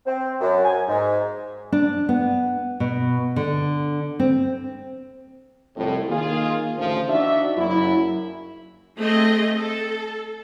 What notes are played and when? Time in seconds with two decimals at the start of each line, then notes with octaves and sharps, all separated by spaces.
0.07 C4
0.41 F#2
0.65 G#5
0.88 G#2
1.72 D4
2.09 B3
2.80 B2
3.36 D3
4.20 C4
5.77 C2 F2 A2
6.09 D#3 A#3 F4 G#4
6.77 A1 D2 F3
7.09 D4 D#4 F#4 D5 E5
7.57 F#1 F#2 E4
9.00 A3 C4 G#4 D#5
9.56 A4